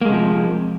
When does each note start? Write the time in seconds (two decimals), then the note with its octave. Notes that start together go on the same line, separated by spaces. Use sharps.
0.01 A#3
0.05 G#3
0.09 C3
0.13 F3